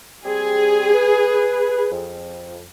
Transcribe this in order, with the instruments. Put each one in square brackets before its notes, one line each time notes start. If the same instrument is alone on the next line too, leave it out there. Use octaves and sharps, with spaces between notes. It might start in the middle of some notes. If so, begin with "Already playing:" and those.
[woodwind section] G3 C4 G4 [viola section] G#4
[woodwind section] B4
F2